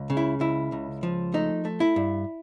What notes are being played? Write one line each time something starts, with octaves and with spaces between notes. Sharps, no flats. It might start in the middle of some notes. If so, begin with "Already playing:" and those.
Already playing: C#2
C#3
E4
C#2 E4
C#2
F3
A3 D#4
A3
E4
G2